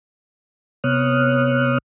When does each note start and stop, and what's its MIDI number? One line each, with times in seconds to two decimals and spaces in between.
0.84 1.78 48
0.84 1.78 59
0.84 1.78 73
0.84 1.78 87
0.84 1.78 89
0.84 1.78 90